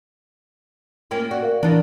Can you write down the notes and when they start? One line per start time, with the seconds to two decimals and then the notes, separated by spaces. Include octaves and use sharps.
1.11 A#3 C#4 F4 G5
1.31 F#4 D5
1.42 A#4 F5
1.63 D#3 E3 D4